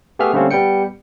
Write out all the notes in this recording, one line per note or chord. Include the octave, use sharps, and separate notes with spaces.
A3 B3 G4 G#4 E5 F6
D3 G3 A3 A#3 C4 C#4
G3 B3 G5 C#7